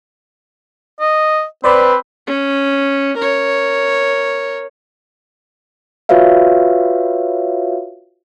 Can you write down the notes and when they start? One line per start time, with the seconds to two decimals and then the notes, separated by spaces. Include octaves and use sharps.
1.00 D#5
1.64 C4 B4 C5 D5 B5
2.27 C#4
3.17 A#4 C#5
6.09 F4 F#4 B4 C#5 E5 F5